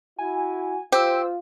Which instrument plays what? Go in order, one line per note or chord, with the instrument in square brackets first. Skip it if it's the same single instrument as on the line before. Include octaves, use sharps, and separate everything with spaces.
[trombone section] E4 F#4 [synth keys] G#5
[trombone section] F4 [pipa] G4 [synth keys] C5 E6